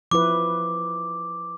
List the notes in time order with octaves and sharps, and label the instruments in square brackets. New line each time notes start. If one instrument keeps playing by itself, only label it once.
[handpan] F3 E4 B4 [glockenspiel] D6